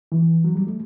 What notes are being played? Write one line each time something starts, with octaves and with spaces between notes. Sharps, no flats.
E3
F#3
G3
A3